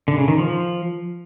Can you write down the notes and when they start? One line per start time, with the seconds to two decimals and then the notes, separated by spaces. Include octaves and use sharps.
0.08 D3
0.18 C#3
0.28 D#3
0.38 F3